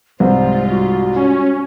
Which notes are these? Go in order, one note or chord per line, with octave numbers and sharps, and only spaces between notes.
C2 G#2 G3 F4 C5
F#4
C#4